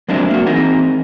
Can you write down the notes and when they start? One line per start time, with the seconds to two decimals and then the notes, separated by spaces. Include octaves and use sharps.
0.08 F#3 G#3 A#3 C4 D4 E4
0.31 A#3 F#4
0.46 E3 C4 D#4 G#4 A#4